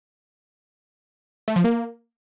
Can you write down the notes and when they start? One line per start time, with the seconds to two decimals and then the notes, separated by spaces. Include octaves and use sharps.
1.48 A3
1.56 F3
1.64 A#3